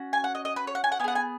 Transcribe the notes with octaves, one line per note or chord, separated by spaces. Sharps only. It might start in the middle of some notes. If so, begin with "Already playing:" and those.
Already playing: C#4 F#4
G#5
F#5
D#5
D#5
B4
C#5
F#5
G#5
F#5
B3 G#4 F#5 G#5
G#5